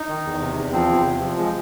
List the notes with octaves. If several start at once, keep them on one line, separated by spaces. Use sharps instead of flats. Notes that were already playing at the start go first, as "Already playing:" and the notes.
Already playing: D#4
D#3
E2
C3
E2
F3 C4
E2
C3
F3
G#3